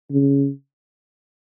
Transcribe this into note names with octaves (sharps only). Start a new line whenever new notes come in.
C#3